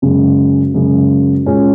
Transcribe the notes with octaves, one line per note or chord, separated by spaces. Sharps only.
F#2 C#3 G#3
F#2 C#3 G#3
A#2 G#3 C#4